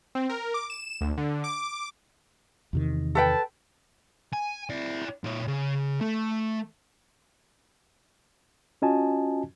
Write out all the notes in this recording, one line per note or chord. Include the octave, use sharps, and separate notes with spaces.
C4
A#4
D6
E7
D2
D3
D6
E2 C3 D#3
A4 B4 G5 A5
G#5
E4 D5
A#2 C#5
C#3
A3
C#4 F4 F#4 D#5 G#5 A5